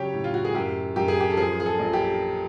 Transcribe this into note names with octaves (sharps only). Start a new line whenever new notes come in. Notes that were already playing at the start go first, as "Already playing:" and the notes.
Already playing: C#3 F#3 G4 C#5
A2
F4
F#4
G#4
F#2 G4
F#2 G4
G#4
G4
A4
F3 G#4
G#4
A4
A#1
G4